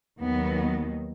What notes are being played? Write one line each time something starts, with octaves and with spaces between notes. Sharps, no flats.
D#2 D#3 F#3 B3